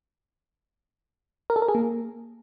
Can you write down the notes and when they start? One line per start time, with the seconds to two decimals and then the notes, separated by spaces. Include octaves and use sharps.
1.50 A#4
1.56 A4
1.62 A#4
1.68 G#4
1.75 A#3